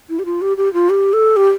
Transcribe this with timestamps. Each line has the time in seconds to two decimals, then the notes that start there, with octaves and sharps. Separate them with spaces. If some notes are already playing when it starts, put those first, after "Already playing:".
0.09 E4
0.19 G4
0.25 F4
0.41 G4
0.57 G4
0.73 F4
0.89 G4
1.13 A4
1.36 G4